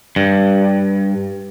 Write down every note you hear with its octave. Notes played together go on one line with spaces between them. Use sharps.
G2